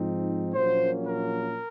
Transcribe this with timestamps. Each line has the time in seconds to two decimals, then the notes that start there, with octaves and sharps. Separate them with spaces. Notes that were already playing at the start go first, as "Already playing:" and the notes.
Already playing: G#2 F3 C4 D#4
0.54 A#1 A#2 F#3 A#3 C#4 C5
1.07 A#4